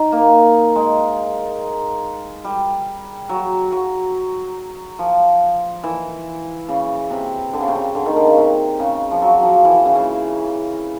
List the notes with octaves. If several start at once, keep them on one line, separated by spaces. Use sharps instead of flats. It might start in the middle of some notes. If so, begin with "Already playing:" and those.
Already playing: D#4
A#3
G#3
G3
F#3
F#3
F3
E3
C#3
C3
D3
C#3
C3
C#3
D3
D#3
D3
C#3
C3
C#3
F3
F#3
F3
E3
E3
C#3
C#3